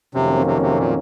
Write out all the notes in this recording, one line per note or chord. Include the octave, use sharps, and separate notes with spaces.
F2 C3 D#3 F#3 A#3 C#4
C3
C3
A#2